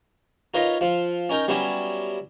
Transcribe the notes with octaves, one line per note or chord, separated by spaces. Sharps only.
D#4 F4 A#4 B4 C#5 D#5
F3 F4
C#4 D#4 A#4 G5
F#3 G3 B3 C#4 E4